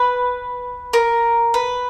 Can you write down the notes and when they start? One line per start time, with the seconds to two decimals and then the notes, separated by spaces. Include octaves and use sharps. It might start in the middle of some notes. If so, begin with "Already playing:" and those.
Already playing: B4
0.93 A#4
1.54 B4